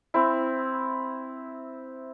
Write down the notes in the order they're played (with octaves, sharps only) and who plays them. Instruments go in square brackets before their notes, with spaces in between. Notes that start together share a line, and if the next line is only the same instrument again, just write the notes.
[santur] C4 E4